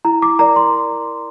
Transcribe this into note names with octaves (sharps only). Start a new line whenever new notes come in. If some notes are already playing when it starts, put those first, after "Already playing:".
E4 A#5
D6
A#4 D5 A#5
C6